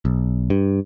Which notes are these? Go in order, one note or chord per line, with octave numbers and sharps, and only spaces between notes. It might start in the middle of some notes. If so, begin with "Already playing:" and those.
B1
G2